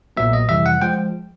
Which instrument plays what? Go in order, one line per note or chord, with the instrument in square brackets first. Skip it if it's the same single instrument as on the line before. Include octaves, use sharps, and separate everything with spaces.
[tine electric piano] B1 A#2 F#3 B3 E5
D#5
F2 C3 E3 G3 E5
F#5
F3 G#3 G5